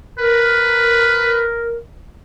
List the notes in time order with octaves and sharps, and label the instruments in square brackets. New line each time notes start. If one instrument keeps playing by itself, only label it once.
[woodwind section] A#4 [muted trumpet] B4